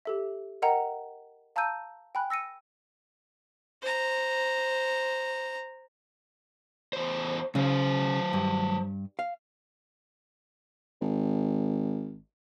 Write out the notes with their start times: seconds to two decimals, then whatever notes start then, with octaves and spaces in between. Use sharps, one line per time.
0.05 G4 A4 E5
0.62 A#4 D#5 F#5 G5 A#5
1.56 F5 A5 A#5 E6 G6 D#7
2.15 G5 G#5 B5 F#6
2.30 E6 A#6 C#7 D#7
3.82 C5 A#5
6.93 E2 C5
7.55 C#3 F#3 C5
8.33 G2
9.19 F5
11.01 G#1